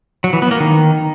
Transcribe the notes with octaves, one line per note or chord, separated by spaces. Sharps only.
F#3
E3
B3
A#3
D#3